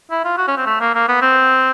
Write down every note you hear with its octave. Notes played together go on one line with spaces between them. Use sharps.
E4
F4
F#4
C#4
C4
A3
A#3
A#3
B3
C4